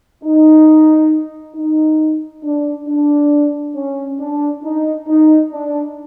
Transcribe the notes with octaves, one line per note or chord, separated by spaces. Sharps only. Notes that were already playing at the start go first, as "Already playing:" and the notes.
D#4
D#4
D4
D4
C#4
D4
D#4
D#4
D4